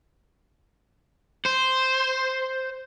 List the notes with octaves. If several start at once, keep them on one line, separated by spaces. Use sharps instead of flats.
C5